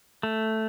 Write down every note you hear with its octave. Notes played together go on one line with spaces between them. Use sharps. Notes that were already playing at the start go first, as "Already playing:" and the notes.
A3